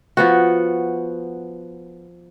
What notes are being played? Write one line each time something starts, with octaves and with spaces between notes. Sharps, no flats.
F3 B3 F#4